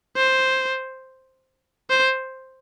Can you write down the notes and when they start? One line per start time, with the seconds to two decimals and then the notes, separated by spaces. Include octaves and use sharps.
0.16 C5
1.90 C5